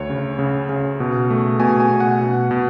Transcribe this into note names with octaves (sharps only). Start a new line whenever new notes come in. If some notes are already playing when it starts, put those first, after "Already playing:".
Already playing: D2 C#5
C#3
C#3
C#3
B2
A3
B2 G#5
G#5
B2
F#5
B2
B2